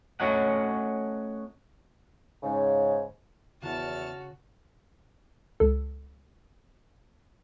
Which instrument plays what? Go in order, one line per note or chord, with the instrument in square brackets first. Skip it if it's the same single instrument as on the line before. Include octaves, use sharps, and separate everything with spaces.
[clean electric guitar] A3 C#4 F#4 C#5 D#5 F#5
[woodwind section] G#2 C#3
[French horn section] E2 [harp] C#3 [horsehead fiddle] F#4 [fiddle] A5 F6
[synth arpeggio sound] C#2 A4